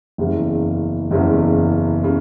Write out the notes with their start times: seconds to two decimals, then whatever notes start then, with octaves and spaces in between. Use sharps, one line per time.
0.18 F#1 E2 C#3
1.11 F#1 E2 C#3
2.04 C#3